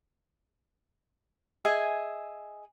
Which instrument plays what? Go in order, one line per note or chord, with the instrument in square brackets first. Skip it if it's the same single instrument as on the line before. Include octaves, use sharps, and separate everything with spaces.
[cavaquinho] G#4 D#5 E5 G#5